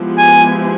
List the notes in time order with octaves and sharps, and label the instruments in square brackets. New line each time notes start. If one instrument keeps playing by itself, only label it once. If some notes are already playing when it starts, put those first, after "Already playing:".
Already playing: [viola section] F3 G#3 B3 E4 G4
[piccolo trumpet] G#5